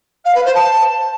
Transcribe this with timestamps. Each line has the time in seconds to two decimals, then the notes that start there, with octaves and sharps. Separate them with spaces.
0.24 F5
0.34 B4
0.44 C5
0.54 A5